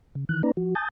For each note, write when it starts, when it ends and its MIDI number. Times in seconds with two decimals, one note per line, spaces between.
0.15 0.25 49
0.29 0.42 51
0.29 0.42 52
0.29 0.42 90
0.43 0.52 58
0.43 0.52 61
0.43 0.52 63
0.43 0.52 71
0.43 0.52 74
0.43 0.52 82
0.57 0.74 53
0.57 0.74 66
0.75 0.88 80
0.75 0.88 81
0.75 0.88 87
0.75 0.88 91
0.75 0.88 93